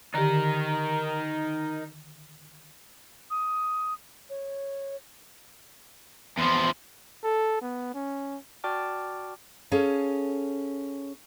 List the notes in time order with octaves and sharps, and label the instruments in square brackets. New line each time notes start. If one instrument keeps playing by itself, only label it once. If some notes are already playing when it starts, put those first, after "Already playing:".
[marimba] D3 D#3 G4 [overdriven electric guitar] D#4 A#4
[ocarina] D#6
C#5
[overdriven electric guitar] E2 F3 [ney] C6
[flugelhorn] A4
B3
C#4
[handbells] F#4 D5 G5 A5 D6 F6
[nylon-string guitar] C#4 G#4 A4 F5